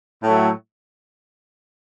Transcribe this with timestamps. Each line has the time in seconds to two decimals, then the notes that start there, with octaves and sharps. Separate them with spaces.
0.23 A2 F#3 A3